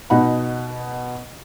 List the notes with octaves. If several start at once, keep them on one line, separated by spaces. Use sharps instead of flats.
B2 D#4 F#5 B5